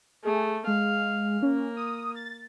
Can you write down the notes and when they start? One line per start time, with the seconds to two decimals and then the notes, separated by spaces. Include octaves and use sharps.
0.25 A3 G#4
0.67 G#3 F5
1.42 A#3 C#4
1.77 D#6
2.15 A6